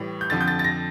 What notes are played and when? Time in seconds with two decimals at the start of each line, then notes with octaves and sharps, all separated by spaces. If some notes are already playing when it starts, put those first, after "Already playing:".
Already playing: A2 E3 G3
0.21 G6
0.30 F2 D3 F3 A6
0.41 G6
0.48 A6
0.59 A6
0.64 A#6